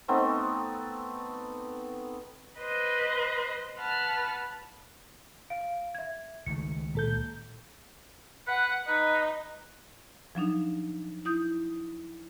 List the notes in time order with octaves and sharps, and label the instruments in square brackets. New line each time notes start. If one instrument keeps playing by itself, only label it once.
[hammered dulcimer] A3 B3 C4 D#4
[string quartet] B4 C5 D#5
B4 F#5 A5 F6
[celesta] F5 D7
E5 G#6
[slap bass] C#2 D#3 A3 [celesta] C#7
[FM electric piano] A#2 A4 G6
[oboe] B4 [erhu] F#5
[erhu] D#4 [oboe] B4
[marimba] F3 F#3 D4 D#4
E4 D#6 G6